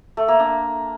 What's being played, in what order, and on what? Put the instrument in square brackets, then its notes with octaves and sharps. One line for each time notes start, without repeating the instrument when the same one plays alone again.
[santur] A3
A#3
D4